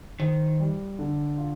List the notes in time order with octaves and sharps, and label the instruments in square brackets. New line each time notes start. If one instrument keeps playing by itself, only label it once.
[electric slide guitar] D#3 [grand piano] C5
[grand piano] G3
D3
F4